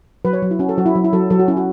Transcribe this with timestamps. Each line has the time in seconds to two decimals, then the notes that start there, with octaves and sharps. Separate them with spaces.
0.25 F#3 B4
0.33 C#5
0.42 F#3
0.51 E4
0.59 C#4 F#4
0.69 A4
0.77 F#3 F#4
0.86 E4
0.95 F#3
1.04 E4
1.13 F#3 A4
1.30 F#3 A4
1.39 F#4
1.48 C#4 E4
1.57 F#4